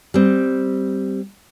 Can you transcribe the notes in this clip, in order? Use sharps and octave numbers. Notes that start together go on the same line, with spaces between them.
G3 C4